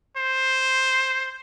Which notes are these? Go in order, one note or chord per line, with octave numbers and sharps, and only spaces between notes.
C5